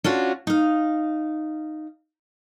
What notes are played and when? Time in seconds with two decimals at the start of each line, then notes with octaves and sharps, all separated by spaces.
0.04 C#4 D4 F4 F#4
0.47 D#4 F5